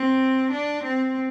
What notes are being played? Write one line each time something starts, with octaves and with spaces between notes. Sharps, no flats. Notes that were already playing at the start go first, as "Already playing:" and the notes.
Already playing: C4
D4
C4